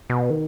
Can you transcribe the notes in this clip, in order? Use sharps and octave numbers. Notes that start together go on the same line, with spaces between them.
B2
D#3